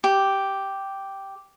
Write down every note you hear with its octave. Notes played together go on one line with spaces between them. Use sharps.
G4